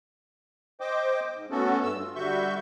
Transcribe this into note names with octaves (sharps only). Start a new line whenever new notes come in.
C5 D#5 G5 D6
G#2
A3 B3 C#4 F#4 A4
G2 E6
F4
D3 G3 F#4 E5 C#6 G6